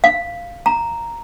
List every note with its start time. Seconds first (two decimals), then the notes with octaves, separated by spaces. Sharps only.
0.04 F5
0.66 A#5